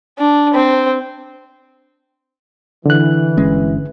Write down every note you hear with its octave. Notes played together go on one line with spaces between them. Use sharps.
D4
C4
D3 E3 F#6
G1 G#3 C#4